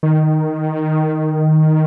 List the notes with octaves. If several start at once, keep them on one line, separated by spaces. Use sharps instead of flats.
D#3